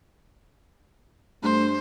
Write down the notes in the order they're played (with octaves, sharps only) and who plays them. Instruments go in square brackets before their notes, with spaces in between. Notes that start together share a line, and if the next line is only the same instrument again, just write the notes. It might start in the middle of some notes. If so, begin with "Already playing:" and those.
[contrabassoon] G2 [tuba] A3 [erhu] C5